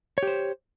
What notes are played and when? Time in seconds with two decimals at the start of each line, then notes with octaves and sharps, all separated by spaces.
0.18 C#5
0.23 G4
0.27 C5